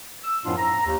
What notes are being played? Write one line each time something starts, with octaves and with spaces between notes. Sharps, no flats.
E6
F#2 A2 F3 B3 D4 F4
A#5
D#2